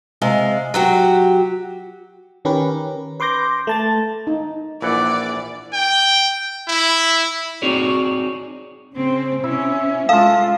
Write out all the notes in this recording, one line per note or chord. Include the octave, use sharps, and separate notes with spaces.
C3 G#3 F5
F#3 F#4 G4
D#3 C#4 G4 A#4 B4
B4 C6 D6 G6 A#6
A3 A5 A6
D#4
A#1 E3 D5 F#5
G5
E4
C4 D#4 F#4 G#4 C#5 D5
C#3 C4
C3 C#4 E4 E5
G#3 F4 A4 F5